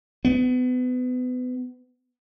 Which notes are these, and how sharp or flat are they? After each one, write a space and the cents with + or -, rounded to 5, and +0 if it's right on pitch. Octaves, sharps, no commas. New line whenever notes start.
B3 +30